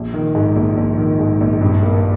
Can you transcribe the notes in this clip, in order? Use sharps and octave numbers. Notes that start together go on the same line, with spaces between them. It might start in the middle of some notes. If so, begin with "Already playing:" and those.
Already playing: A#1
D#3
G#2
A#1
A#1
D#3
G#2
A#1
G2
A#3